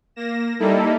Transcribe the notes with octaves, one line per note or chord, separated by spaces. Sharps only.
A#3 A#6 E7
G3 A#3 D#4 E4 A4